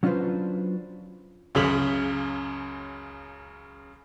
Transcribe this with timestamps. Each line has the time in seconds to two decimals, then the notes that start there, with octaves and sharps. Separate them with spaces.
0.03 F#3 C#4 D4 F4 B4 C5
1.55 C#2 F#2 C#3 B6 F#7